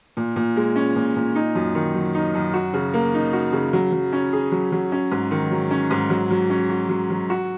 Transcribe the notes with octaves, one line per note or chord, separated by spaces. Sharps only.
A#2
A#2
G#3
C#4
A#2
A#2
D#4
F#2
D#3
F#3
D#4
F#2
F#4
C#3
A#3
D#4
F#4
C#3
F#3
F#3
C#4
G#4
F#3
F#3
C#4
G#2
D#3
F#3
C#4
G#2
F#3
F#3
C#4
F#4
F#3
F#3
F#4